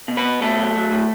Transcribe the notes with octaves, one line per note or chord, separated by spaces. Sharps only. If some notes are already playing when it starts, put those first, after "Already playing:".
B2
B3 B4
B2
B2 A3 A4
F#3
F#3
A2